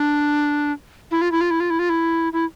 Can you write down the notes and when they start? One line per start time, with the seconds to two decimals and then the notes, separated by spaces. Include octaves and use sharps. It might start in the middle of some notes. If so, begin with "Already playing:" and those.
Already playing: D4
1.11 E4
1.21 F4
1.32 E4
1.41 F4
1.50 E4
1.60 F4
1.70 E4
1.79 F4
1.89 E4
2.33 E4